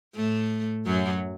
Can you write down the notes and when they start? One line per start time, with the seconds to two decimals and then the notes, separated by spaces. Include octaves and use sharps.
0.16 A2 A3
0.85 F#2 F#3